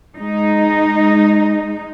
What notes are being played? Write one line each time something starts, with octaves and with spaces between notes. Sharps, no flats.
G#3 D#4